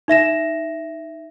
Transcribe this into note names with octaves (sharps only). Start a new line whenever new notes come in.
D#4 E5 A#6 E7